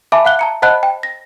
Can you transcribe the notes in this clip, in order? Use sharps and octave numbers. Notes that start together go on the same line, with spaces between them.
E5 G#5 A5 B5 D6
F5 F#5 F#6 G7
A5 A#5 C#7
C5 D#5 F#5 A5 B5 F#6
G5
A#6